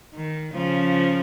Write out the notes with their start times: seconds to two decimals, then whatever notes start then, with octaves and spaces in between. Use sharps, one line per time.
0.15 D#3
0.54 C#3 F3